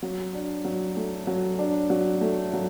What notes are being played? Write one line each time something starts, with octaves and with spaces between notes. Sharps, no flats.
F#3
D4
F#3
A3
F#3
D4
F#3
A3
F#3